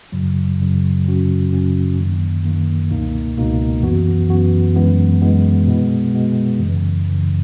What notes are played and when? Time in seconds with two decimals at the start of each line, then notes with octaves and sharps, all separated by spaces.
0.12 F#2 C#3 F#3
0.59 F#2 C#3 F#3
1.05 F#2 C#3 F#3 C#4 F#4
1.51 F#2 C#3 F#3 C#4 F#4
1.97 F#2 D#3 A#3
2.43 F#2 D#3 A#3
2.90 C#2 B2 A#3 D#4
3.37 C#2 B2 A#3 D#4
3.82 F#2 E3 B3 F#4
4.29 F#2 E3 B3 F#4
4.76 F#2 E3 G#3 B3 E4
5.22 F#2 E3 G#3 B3 E4
5.67 B2 G#3 B3
6.14 B2 G#3 B3
6.60 F#2 C#3 E3
7.06 F#2 C#3 E3